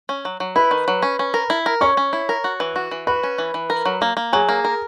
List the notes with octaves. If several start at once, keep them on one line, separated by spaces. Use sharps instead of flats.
C#4
F#3
F#3
E4 B4 B5
D#3
F#3
C#4
C#4
A#4
E4
A#4
C#4 C#5 C#6
C#4
E4
A#4
F#4
E3
F#4
E3
F#4 B4 B5
C#4
E3
E3
A#4
F#3
A#3
A#3
F#3 G#4 G#5
A#3
A#4